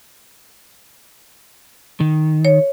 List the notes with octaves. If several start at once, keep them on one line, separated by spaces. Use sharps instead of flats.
D#3
C#5